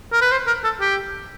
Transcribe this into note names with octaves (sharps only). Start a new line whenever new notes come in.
A#4
B4
C5
A#4
A4
G4